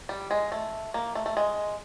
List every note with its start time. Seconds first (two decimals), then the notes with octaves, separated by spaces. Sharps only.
0.09 G3
0.31 G#3
0.52 A3
0.94 A#3
1.15 A3
1.26 A3
1.37 G#3